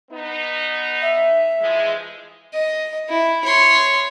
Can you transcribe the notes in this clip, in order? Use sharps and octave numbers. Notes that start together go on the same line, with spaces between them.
B3 D#4
E5
E3 F3 G#3
D#5
E4
C#5 C6